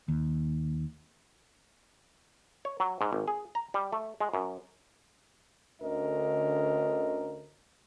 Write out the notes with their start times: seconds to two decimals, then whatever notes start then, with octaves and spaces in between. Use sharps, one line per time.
0.08 D#2
2.65 C#5
2.80 F#3
3.01 G#2
3.13 G#1
3.28 G#4
3.55 A#5
3.74 G3
3.93 A3
4.20 G#3
4.34 F#2
5.81 D2 D3 C#4 A#4 D#5